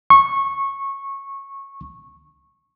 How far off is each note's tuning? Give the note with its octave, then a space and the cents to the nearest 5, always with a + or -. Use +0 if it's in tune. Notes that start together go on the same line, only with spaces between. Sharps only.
C#6 -15